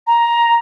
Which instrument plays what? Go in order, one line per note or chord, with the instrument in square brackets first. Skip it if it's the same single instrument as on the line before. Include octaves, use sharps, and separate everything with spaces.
[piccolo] A#5